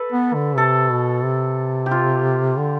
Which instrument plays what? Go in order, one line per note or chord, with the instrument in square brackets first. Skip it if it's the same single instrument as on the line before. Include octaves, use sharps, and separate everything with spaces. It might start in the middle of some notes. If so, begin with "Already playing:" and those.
Already playing: [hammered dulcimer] A4 B4
[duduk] B3
D3
[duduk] C3 [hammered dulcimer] A4
[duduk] B2
C3
[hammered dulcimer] G4
F4
[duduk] D3